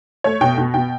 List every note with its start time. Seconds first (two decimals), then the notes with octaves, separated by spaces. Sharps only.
0.24 A3 C#5
0.41 B2 G5
0.58 B2
0.74 B2 G5